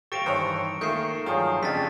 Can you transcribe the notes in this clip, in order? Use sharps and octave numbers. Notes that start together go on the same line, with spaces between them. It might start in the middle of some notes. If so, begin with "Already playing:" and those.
G4 A4 C5 F5 C#6 A#6 D7
G2 D#3 E3 C5 C#5 C#7
D#3 A3 A#3 G#5 G6 C7 E7
G2 D#3 F3 F#3 F4 G#4
F2 C#3 A3 D4 G4 A6 B6